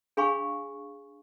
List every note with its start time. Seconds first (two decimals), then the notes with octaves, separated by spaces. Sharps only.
0.17 D4 G#4 F5 G#5 B5 C#6